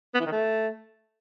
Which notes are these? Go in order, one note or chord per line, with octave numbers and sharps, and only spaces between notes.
B3
E3
D#3
A3